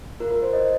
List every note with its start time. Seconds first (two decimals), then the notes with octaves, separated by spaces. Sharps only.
0.20 A#3 F4 A#4
0.31 A#4
0.42 C5
0.53 D#5